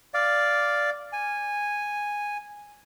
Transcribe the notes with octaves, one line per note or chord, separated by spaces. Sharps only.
D5 F5
G#5